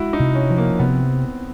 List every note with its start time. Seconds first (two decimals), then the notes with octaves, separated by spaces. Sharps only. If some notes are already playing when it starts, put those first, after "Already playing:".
Already playing: G#3 E4 F#4
0.13 D#4
0.20 C3
0.35 C#4
0.50 F3
0.58 A#3
0.79 C3 B3
0.88 C4